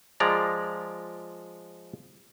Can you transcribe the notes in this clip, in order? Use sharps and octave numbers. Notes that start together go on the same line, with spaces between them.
F3 G#3 D5 A#5